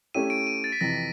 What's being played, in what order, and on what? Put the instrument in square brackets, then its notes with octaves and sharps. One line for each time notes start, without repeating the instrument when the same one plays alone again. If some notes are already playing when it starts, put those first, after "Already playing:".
[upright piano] A3 C#4 E4 G4 [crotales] D#7
[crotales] D7
D#7
A6
B6
[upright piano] F2 C3 E3 [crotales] A#6